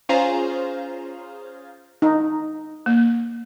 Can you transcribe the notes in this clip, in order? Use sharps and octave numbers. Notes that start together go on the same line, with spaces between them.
C#4 F4 G#4 C5 F5 A#5
D#4
A#3